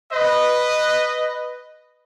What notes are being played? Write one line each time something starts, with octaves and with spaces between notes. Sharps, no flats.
B4 D#5